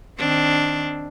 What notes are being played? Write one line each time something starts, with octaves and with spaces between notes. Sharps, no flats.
D#3 C4 D4